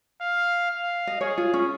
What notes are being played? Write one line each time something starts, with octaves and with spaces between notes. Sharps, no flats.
F5
F5
D#5
G#4 C#5
F4
C#4